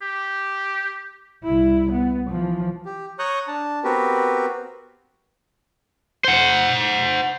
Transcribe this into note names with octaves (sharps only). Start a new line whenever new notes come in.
G4
C2 E4
B3
E3 F3
G4
C#5 A#5 C#6 D#6 F#6 G6
D4 A5
B3 C4 F#4 G4 A#4 B4
C5 F#5